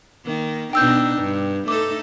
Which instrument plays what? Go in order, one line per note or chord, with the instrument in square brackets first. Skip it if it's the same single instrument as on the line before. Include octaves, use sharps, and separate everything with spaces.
[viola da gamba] D#3 A#3
[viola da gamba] B2 D4 D#4 [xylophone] G5 E6 G6
[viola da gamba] G2
[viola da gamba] A3 D#4 A4 [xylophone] D6